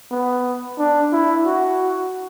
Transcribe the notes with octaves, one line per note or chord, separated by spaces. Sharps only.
B3
D4
E4
F#4